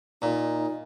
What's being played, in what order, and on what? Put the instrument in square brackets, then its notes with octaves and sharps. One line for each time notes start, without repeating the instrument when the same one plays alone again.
[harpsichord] A#2 [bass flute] D#4